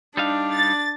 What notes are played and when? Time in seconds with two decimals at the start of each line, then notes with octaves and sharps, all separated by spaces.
0.17 G3 D4 D#4 F5
0.51 A6